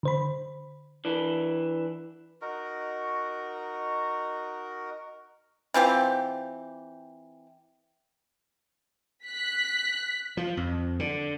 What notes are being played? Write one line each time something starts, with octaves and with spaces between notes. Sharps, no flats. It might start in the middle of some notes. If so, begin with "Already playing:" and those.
D3 C5 B5
E3 D4
D#4 F#4 A#4
E3 C4 F4 G4
F#6 B6
F3
F2
D3